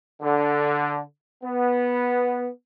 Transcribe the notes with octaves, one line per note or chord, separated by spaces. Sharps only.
D3
B3